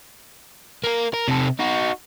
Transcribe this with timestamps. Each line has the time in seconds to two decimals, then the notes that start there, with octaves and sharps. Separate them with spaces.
0.84 A#3 A#4
1.14 A#4
1.28 C3 A4
1.60 D#4 F#4